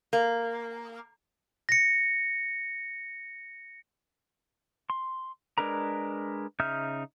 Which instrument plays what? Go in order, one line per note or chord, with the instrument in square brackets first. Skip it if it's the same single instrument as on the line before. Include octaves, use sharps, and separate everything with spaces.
[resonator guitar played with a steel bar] A#3
[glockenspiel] A#6 C#7
[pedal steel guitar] C6
G#3 D4 A#4 B4 A#5
C#3 D#4 E5 F6 G6